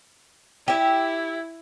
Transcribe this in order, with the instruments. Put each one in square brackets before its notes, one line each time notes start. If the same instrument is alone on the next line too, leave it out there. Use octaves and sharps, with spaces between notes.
[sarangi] E4 [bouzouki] G4 E5